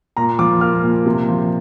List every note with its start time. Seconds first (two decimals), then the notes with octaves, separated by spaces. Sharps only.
0.17 A#2 A#5
0.39 F3 D6
0.61 A#3 F6
0.83 A#2
1.06 C3
1.29 F3